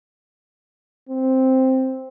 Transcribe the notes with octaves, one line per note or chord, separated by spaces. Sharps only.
C4